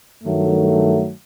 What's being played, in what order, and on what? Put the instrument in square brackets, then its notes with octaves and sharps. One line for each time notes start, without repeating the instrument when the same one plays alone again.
[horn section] G2 D#3 F#3 A3